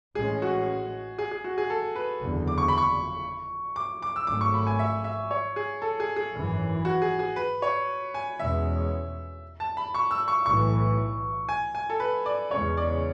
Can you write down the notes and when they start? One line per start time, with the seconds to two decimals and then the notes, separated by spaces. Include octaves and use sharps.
0.15 A1 A2 G#3 C#4 G#4
0.42 F#4
1.18 G#4
1.31 G#4
1.44 F#4
1.58 G#4
1.70 A4
1.96 B4
2.22 F#1 E2 D3
2.48 D6
2.58 C#6
2.68 B5
2.78 C#6
3.76 D6
4.02 D6
4.16 E6
4.27 G#1 G#2 F#3 A3 C#4 D6
4.41 C#6
4.54 B5
4.67 G#5
4.79 E5
5.04 E5
5.31 C#5
5.56 G#4
5.82 A4
6.00 G#4
6.16 G#4
6.34 G#1 F#2 E3
6.85 F#4
7.02 G#4
7.19 G#4
7.36 B4
7.62 C#5
8.14 G#5
8.39 E2 B2 G#3 C#4 E5
9.60 A5
9.77 B5
9.94 C#6
10.11 E6
10.28 C#6
10.46 B1 A2 E3 C#6
11.49 G#5
11.75 G#5
11.90 A4
12.00 B4
12.26 D5
12.51 E2 C#3 G#3 C#4 C#5
12.77 D5